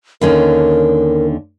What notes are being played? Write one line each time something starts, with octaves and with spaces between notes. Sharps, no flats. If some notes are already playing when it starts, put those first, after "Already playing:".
D#2 D3 C#4 A#4